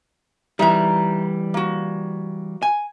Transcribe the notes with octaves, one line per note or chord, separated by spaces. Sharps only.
E3 G3 D#4 E5 A#5
A#3 F#4
G#5